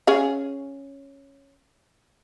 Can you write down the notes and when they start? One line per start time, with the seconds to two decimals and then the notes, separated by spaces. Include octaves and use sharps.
0.07 C#4 G#4 F5